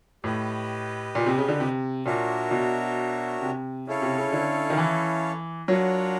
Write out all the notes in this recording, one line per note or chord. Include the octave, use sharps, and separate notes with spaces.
A2 G4 B4 D#5
A#2
C3
C#3
D3
C3
A#2 D4 F#4 A#4 C#5 E5
B2
C3
C#3 C#4 E4 A4 C#5 F5
C3
C#3
D3
D#3
E3
F#3 D4 F4 A#4 C#5 F#5